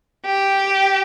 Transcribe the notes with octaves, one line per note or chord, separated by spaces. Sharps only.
G4